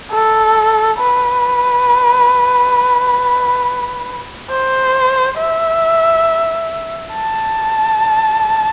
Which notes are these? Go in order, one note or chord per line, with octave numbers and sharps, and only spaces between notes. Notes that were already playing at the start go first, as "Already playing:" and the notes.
A4
B4
C5
E5
A5